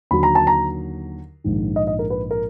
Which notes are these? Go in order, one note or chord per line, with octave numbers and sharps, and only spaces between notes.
D#2 D3 F#3 B5
A#5
A5
A#5
A#1 G#2 D#3
D#5
D#5
A#4
B4
A#4